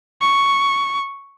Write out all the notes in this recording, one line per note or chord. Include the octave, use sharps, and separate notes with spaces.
C#6